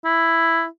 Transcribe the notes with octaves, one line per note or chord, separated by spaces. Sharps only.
E4